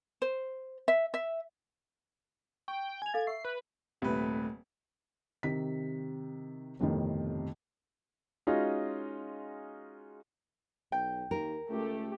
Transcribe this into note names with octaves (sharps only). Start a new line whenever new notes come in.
C5
E5
E5
G5 C#6
G#5 G#6 F7
A4 F5 A6
E5 C#6 E6 C7
B4
D#1 C3 A3 B4
C3 D#3 B6
G1 F2 A2 C3 D#3
G#3 C#4 D#4 F4 F#4 D#5
B1 G5
D#2 A#4
C#2 A3 G4